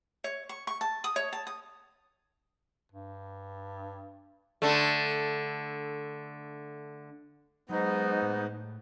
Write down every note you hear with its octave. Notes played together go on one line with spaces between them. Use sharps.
C#5
C#6
C#6
A5
D#6
C#5
A5
D#6
G2
D3 A3
G#2 F#3 B3 D#4
A2